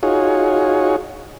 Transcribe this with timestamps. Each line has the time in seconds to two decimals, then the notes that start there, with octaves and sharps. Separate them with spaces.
0.03 D#4 F4 F#4 G#4 C#5